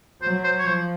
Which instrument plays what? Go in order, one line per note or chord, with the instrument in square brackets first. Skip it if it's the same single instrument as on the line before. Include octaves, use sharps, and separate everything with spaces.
[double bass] F#3 [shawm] C5
[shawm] C5
C#5
[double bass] F3 [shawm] C5